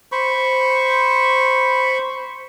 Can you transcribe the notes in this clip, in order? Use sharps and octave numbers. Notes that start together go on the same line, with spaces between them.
C5 B5 C#6